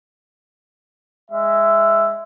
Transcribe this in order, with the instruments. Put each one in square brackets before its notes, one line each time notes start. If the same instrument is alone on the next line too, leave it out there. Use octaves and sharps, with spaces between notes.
[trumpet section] G#3 E5